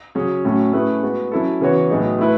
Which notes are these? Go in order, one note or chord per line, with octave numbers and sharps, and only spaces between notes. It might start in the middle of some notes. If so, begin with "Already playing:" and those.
C#3 F#3 C#4 G#4
A2 F#3 A3 C#4
A3 C#4 E4 G#4 B4
G#3 B3 F#4
F#3 C#4 E4 A4
C#3 E3 B3 F#4 C#5
A2 F#3 B3 D#4 G#4
A3 E4 B4